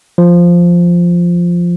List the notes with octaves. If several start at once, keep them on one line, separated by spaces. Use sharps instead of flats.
F3